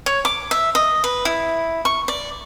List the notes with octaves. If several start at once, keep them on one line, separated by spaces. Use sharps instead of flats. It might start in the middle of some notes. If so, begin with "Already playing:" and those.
C#5
D6
E5
D#5
B4
E4
C#6
D5